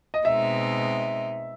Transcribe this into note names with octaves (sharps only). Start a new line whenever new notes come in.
D#5
B2 G#3 C4 D#4 E5